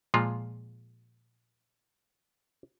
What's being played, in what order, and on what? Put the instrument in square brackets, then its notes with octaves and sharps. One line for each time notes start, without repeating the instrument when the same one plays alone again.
[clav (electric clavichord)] A#2 F3 G#3 F4